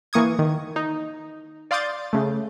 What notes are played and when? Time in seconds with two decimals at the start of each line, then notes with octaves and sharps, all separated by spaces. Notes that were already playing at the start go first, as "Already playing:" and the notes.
0.13 E3 A#3 C#6 D#6 G#6
0.39 D#3
0.76 D#4
1.71 D5 F5 C6 D#6 G6 A6
2.13 C#3 A3